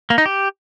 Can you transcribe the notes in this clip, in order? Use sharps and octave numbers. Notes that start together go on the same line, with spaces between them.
A#3
D#4
G4